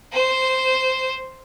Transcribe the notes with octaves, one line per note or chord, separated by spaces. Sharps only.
C5